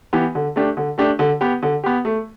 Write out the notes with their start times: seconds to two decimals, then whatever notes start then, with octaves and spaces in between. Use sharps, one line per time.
0.13 E3 B3 G4
0.35 D3
0.56 A3 D4 G4
0.77 D3
0.98 A3 D4 G4
1.19 D3
1.41 B3 G4
1.63 D3
1.84 B3 G4
2.05 A3